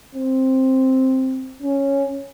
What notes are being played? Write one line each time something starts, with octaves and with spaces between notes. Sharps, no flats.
C4
C#4